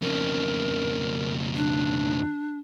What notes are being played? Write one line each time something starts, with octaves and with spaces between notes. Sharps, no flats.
F2 C#3 A#4
D4